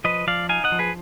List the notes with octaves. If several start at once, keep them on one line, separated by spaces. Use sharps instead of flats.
F3 B4 D#5
F3 D5 F5
D#4 F5 G#5
D#5 F#5
F3
G#4 B4